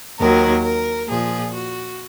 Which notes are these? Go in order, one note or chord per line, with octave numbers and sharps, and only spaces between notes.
D#2 D#3 F#3 A#4
A#4
A#2 F3 G#4
F#4